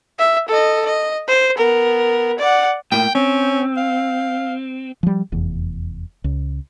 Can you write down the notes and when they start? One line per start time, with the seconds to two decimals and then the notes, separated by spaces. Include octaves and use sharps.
0.19 E5
0.49 A4 D#5
0.86 D#5
1.28 C5
1.58 B3 A#4
2.39 D5 F#5
2.92 A2 A#3 G5
3.15 C4 C#4
3.77 F5
5.03 F3 G3
5.32 F1 E2
6.24 C#2